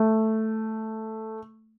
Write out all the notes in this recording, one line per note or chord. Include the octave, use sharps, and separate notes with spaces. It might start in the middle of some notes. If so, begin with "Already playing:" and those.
Already playing: A3